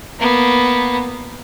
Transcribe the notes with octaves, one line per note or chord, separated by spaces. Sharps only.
A#3 B3